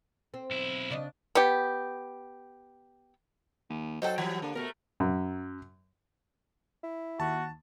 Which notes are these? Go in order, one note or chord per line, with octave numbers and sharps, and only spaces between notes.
C4
B1 E4
C#3 D4 D#5
B3 G4
D#2
F#3 D#4 A4 C5 F#5 G5
E3 G3 A#5
D3 A#3
B2 A3 A#4
F#2
E4
D#2 F#4 A5